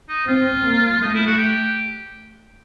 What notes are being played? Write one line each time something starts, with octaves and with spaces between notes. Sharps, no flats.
D#4
C4 F4
A#3
A3 D#4
E4
F#4
G4